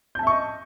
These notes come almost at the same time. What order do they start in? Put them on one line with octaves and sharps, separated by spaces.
G6 A5 E5 C#6 D#5